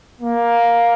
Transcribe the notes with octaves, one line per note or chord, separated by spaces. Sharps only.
A#3